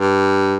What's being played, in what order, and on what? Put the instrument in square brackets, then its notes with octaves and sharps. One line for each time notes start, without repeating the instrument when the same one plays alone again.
[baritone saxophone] G2